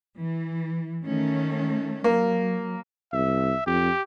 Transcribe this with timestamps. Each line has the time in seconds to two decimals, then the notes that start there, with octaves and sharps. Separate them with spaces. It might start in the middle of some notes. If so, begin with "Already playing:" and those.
0.17 E3
1.06 D#3 A3 C#4
2.04 F#3 A#3
3.13 C2 E5
3.66 F2 G4